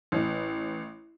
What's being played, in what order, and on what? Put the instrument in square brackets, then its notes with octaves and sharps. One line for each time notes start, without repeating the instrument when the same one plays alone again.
[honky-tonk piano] A1